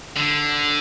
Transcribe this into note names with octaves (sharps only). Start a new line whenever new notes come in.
D3